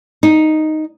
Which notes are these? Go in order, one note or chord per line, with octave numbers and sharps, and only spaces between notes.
D#4